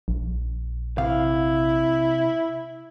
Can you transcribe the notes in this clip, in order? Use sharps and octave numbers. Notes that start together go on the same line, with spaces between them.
A#1
C3 E4 F5